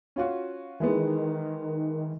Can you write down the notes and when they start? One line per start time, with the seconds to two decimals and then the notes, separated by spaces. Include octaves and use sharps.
0.16 C#4 F4 F#4
0.80 D#3 E3 G#3 B3